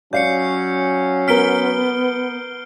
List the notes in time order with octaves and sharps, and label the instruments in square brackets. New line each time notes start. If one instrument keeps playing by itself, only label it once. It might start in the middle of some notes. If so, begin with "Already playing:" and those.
[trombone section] F#3 C#4 [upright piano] D5 F5 [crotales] G6 C7 C#7
[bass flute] B3 [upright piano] A#4 B6 [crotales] F6 D7 G7